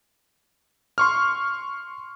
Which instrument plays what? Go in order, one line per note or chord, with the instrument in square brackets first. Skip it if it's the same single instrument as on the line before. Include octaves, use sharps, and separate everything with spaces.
[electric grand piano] C6 C#6 F6